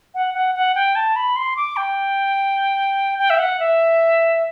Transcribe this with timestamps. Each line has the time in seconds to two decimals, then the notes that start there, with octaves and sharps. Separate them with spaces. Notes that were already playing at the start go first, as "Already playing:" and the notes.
0.14 F#5
0.34 F#5
0.55 F#5
0.75 G5
0.95 A5
1.16 B5
1.36 C6
1.56 D6
1.76 G5
3.18 G5
3.30 E5
3.39 F#5
3.59 E5